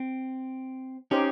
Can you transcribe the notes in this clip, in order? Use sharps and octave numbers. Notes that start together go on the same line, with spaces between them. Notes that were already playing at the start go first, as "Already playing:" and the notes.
Already playing: C4
C#4 D#4 G4 C5